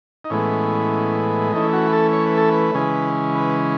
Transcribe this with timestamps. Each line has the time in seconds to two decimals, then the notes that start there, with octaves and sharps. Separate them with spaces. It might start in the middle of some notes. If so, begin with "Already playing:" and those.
0.25 D#4
0.30 A2 E3 G#3 B3 C#4
1.52 E3 A3 C#4 D#4
1.73 F#4
1.86 B4
1.93 A4
2.13 C#5
2.26 B4
2.38 A4
2.50 B4
2.75 C#3 E3 G#3 C#4
3.35 B4